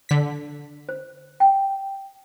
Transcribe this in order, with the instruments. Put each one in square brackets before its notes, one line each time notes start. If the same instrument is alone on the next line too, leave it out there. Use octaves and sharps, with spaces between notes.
[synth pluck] D3 B6
[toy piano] C5
G5